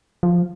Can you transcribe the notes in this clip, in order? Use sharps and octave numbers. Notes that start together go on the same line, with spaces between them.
F3